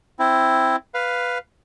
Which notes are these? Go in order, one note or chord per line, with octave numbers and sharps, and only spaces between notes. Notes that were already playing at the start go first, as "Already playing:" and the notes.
C4 E4
B4 F5